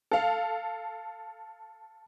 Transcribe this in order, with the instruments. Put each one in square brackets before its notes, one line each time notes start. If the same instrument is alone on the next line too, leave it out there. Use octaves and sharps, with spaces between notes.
[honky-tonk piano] A4 F5